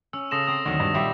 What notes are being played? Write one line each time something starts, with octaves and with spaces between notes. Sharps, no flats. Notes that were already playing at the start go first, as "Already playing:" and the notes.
C#4 E6
C#3 A4 C6 D#6 A#6 E7
C4 A#5 D#6
D2 D#3 F#3
G2
A#2 G3 G4 E5